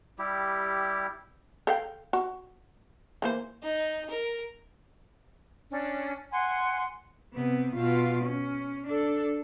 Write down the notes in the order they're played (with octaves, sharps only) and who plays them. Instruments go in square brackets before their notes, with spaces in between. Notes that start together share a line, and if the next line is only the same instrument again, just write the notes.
[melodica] G3 E4 G4
[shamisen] A4 F5 G5
F#4
E3 A#3 C5
[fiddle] D#4
A#4
[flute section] C#4 D4
F#5 G#5 C6
[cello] C3 B3
B2 F4
C#4
D4 A4